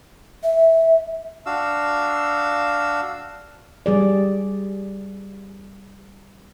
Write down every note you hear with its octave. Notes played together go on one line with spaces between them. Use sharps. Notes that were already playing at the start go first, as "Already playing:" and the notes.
E5
D4 F#4 F5 E6
G3 G#4 D5